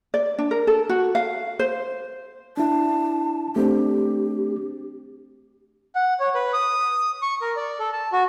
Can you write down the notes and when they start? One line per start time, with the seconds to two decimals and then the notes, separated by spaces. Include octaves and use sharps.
0.14 D5
0.38 D4
0.51 A#4
0.67 A4
0.89 F#4
1.15 F5
1.59 C5
2.57 D4 E4 A5
3.56 A3 C4 D4 G4
5.95 F#5
6.20 C#5
6.35 B4
6.53 D#6
7.22 C#6
7.42 A#4
7.57 D5
7.79 A4
7.93 A5
8.13 F#4